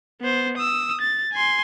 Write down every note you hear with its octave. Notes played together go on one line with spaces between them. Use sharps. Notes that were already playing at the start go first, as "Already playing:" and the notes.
B3 C5
D#6 E6
A6
G#5 C6